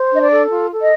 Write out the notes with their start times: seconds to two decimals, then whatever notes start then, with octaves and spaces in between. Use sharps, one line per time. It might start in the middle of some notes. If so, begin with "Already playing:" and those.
Already playing: C5
0.11 D4 D#5
0.20 D5
0.30 A4
0.50 F4
0.70 A4
0.80 D#5